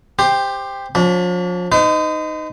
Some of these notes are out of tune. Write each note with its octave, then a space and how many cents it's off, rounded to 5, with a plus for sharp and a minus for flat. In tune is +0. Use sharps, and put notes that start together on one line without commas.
G4 +15 C5 +0
F3 +40 D4 -40
D#4 +0 C5 -45